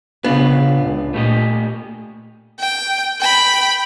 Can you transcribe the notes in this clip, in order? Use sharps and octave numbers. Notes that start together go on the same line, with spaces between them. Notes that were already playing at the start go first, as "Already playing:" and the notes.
C#3 B3 D4 F4
C#2
A#2 A3 G4 D#5
G5
G5 B5